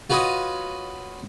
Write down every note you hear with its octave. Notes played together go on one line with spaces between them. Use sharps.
F4 F#4 B4 C#5 D#5 D#6